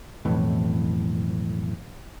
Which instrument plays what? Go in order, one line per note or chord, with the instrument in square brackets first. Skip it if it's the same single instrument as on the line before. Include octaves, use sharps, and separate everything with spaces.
[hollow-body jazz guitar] B1 F2 A2 E3